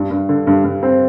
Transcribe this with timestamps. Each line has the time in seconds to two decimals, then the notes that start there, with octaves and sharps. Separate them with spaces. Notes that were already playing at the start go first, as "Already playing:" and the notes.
Already playing: G2
0.11 G2
0.29 D3
0.47 G2
0.64 G2
0.83 C4